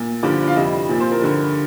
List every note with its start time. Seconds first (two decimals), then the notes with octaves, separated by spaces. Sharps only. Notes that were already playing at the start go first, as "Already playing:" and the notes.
Already playing: A#2
0.23 G2 D3 F3 D5
0.48 F5
0.56 F2 C3 G3 D#5
0.89 A#2 F3
1.00 C5
1.11 A#4
1.22 G2 D3 G3